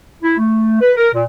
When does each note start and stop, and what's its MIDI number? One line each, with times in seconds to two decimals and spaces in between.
0.23 0.35 64
0.38 0.81 57
0.81 0.91 71
0.97 1.09 70
1.14 1.24 46